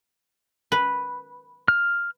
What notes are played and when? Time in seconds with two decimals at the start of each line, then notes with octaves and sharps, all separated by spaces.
0.72 B4
1.68 F6